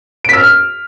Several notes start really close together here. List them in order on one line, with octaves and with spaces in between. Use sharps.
D7 B6 E6 F6